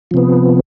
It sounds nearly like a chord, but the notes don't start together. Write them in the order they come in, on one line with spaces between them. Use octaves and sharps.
F3 C3 B3